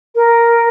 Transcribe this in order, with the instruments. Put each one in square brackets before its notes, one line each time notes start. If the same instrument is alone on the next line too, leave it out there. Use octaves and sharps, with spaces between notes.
[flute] A#4